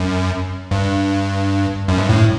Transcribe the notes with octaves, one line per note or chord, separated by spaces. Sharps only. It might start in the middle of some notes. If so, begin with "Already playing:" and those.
Already playing: F#2
G2
F#2
G2
A2